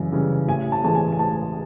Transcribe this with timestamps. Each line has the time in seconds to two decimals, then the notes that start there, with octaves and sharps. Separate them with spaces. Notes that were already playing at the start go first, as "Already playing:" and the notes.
Already playing: F#2 C#3 E3 G3
0.12 C#3 E3 G3
0.48 A1 G#5
0.72 A5
0.84 A2 E3 G#3 A5
0.95 G#5
1.12 G#5
1.19 A1 A5